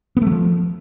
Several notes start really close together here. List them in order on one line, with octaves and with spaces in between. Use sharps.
B3 A3 F#3 F3